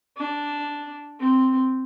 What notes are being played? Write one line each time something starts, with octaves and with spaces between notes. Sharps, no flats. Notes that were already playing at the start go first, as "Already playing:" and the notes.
D4
C4